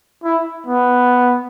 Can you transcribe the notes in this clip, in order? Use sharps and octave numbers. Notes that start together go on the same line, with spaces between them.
E4
B3